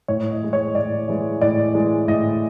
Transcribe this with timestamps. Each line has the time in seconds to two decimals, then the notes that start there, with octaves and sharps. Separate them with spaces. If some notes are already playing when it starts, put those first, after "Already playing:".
0.08 A2 C#5
0.31 D#5
0.42 E3 G#3
0.53 C#5
0.75 A2 D5
1.08 E3 G#3
1.41 A2 D5
1.75 E3 G#3
2.08 A2 D#5